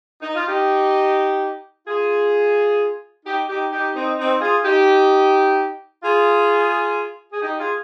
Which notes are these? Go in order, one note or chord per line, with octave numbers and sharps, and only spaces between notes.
D#4
F4
D#4 G4
F4 G#4
D#4 G4
D#4 G4
D#4 G4
C4 D#4
C4 D#4
F4 G#4
D#4 G4
F4 G#4
G#4
D#4 G4
F4 G#4